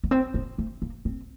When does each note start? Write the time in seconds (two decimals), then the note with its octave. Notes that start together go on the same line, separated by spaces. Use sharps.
0.04 B3
0.11 C4
0.34 B3
0.58 A3
0.82 A#3
1.05 C4